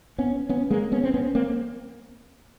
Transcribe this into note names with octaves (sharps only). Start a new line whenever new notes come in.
B3 C#4
B3 C#4
G#3 A#3
B3 C#4
C4
B3 C#4
A#3 C4